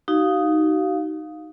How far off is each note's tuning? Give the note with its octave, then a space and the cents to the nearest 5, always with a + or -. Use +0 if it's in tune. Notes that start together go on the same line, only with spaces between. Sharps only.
D#4 +0 F#4 +40 F5 +10